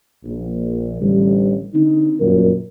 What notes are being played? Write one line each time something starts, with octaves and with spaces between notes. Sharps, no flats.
A#1
A1 D3 G3
D3 C4 D#4
G1 F#2 A#2 F#3 A#4